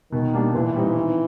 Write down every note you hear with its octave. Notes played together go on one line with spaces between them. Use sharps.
B2 D#3
G3 A#3 D4
A#2 E3
G3 C4 D#4
D#3